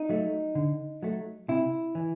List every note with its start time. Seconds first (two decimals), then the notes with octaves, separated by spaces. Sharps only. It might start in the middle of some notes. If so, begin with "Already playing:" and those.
Already playing: D#4
0.09 F#3 A3
0.55 D3
1.03 F#3 A3
1.48 C3 E4
1.95 E3